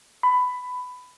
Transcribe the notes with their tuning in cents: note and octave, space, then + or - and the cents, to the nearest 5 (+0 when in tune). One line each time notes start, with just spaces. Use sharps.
B5 +15